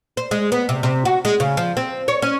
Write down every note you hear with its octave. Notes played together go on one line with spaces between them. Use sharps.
C5
G#3
B3
C3
C3
F#4
G#3
C#3
F3
C4
C#5
C#4